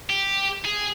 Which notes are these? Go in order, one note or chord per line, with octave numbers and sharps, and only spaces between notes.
G4
G#4